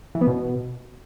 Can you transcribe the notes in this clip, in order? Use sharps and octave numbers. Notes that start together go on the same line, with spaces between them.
E3
B3
B2